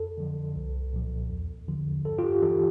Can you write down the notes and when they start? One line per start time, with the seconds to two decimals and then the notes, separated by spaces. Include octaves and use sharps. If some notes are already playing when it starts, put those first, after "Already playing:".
Already playing: F2 A4
0.18 D3 F3
0.55 C2
0.93 A#2 F3
1.30 E2
1.68 D3 F3
2.05 G2 A4
2.19 F4
2.24 G4
2.42 E3 A4